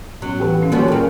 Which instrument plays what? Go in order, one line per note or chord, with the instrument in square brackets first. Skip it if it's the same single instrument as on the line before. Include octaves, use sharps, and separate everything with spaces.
[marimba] A2 B3 C#4 [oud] F#3
[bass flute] E3 [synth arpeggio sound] G4 A4 B4
[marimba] D#3 C#4 F5
[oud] F3 G3 B4 [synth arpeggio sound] A#3 F#4 A4 [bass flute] C#5 [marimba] G#5
[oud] A#2 C#3 [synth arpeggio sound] A4 [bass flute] A#4